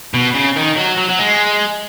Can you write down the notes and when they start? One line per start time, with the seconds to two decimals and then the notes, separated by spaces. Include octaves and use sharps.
0.14 B2
0.35 C#3
0.56 D#3
0.78 F#3
0.98 F#3
1.09 F#3
1.19 G#3